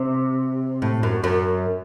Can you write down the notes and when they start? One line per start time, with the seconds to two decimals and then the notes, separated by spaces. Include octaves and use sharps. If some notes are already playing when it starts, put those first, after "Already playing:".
Already playing: C3
0.82 A2
1.03 F#2
1.24 F#2